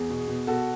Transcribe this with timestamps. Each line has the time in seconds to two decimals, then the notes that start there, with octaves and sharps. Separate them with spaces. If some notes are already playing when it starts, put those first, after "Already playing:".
Already playing: E2 G#4
0.10 B2
0.28 B2
0.47 B2 F#4 A4